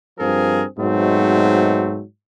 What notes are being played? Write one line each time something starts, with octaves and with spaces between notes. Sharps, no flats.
G2 F3 C4 G#4 A#4
G#2 B2 F#3 A3 C4